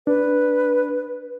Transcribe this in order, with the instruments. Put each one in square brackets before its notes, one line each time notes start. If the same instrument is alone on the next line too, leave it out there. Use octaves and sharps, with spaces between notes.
[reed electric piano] D4 [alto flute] B4